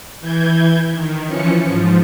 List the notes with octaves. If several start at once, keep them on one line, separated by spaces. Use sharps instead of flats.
E3 G6 G#6
D#3
E3 F3 C#4 C#7
G#2 F3